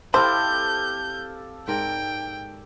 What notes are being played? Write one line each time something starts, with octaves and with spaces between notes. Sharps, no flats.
C4 E4 G4 A4 C5 D#5 F5 G6
G#2 A#4 D5 G5